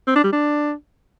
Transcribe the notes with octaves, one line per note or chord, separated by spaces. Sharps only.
C4
D4
G3
D4